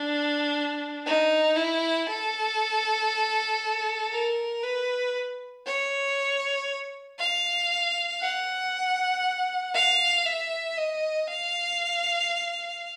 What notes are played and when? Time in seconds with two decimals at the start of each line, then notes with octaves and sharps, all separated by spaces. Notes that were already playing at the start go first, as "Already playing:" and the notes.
Already playing: D4
1.06 D#4
1.56 E4
2.08 A4
4.12 A#4
4.63 B4
5.66 C#5
7.19 F5
8.21 F#5
9.74 F5
10.26 E5
10.77 D#5
11.28 F5